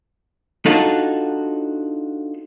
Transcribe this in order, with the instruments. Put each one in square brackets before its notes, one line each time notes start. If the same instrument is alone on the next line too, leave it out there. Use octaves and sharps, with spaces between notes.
[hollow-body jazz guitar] D4 D#4 F4 F#4 A4 C#5